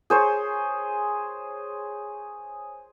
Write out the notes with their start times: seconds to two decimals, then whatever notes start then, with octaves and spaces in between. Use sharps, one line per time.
0.10 G#4 C5 C#5